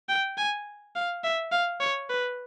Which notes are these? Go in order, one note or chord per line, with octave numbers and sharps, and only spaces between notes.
G5
G#5
F5
E5
F5
C#5
B4